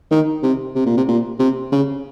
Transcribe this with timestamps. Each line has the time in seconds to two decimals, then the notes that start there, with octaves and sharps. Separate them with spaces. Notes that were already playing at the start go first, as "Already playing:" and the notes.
0.11 D#3
0.43 C3
0.75 C3
0.86 A#2
0.97 C3
1.08 A#2
1.39 C3
1.72 C#3